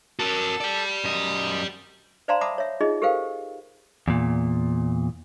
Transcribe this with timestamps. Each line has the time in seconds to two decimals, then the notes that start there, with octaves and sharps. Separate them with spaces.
0.19 F#4 A4 A#4
0.61 G4 D5
1.05 F#2 D#5
2.28 C5 D5 F5 A5 A#5 C6
2.41 E5 F#5 A5 B5 D6 D#6
2.58 C#5 E5
2.80 D#4 F4 G#4 D#5
3.02 G4 A4 A#4 C5 F5 G5
4.08 E2 A#2